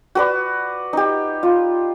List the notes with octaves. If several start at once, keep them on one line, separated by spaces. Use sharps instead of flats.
F#4 B4 D5
D#4 G4
F4